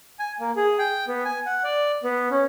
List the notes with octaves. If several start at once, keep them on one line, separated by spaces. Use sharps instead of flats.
G#5
A#3
G#4
G5
B3
G#5
F#5
D5
B3
C#4